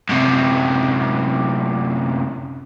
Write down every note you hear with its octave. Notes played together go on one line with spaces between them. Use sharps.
F#2 C3